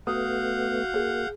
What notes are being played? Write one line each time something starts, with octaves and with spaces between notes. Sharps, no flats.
A3 B3 F#4 F5 F#5 D#6 G6
A#3 G#4